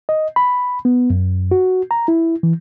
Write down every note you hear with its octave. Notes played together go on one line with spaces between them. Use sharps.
D#5
B5
B3
F#2
F#4
A#5
E4
E3